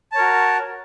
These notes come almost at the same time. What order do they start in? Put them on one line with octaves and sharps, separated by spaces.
A5 C#5 A#4 F#4